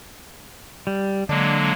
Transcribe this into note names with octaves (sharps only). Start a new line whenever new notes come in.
G3
D3 F#3 G#3 A#3 D4